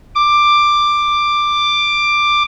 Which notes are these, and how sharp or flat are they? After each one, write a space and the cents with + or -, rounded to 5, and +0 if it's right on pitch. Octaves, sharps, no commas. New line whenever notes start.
D6 +10